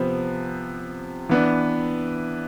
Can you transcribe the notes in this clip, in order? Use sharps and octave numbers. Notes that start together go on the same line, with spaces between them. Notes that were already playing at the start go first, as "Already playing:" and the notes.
Already playing: C3 F3 B3
E3 B3 D4